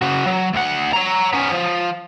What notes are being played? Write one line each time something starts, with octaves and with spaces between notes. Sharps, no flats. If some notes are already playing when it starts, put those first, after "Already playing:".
C#3 F#4
F#3
D2 F#5
C#5 A#5
B3 C#4
F3